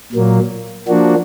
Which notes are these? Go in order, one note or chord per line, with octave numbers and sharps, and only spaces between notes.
A#2 F#3 A#3
F3 A#3 D4 F#4